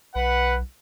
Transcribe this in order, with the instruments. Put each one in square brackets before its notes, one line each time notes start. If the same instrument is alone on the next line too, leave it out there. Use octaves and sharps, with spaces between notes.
[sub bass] B1 [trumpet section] B4 F#5